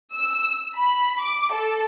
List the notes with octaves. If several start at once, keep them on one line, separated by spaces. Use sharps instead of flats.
E6
B5
D6
A4